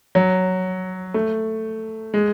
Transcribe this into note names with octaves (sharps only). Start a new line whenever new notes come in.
F#3
A3
G#3